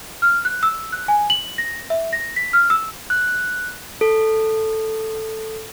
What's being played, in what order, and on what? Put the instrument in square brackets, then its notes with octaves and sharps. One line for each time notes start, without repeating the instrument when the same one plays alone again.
[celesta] F6
F#6
E6
F#6
G#5
F#7
A#6
E5
A#6
B6
F6
E6
[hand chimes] F#6
A4